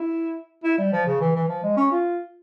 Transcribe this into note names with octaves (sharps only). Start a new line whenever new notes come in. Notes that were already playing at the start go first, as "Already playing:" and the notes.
Already playing: E4
E4
G3
F3
C#3
E3
E3
F3
G#3
C#4
F4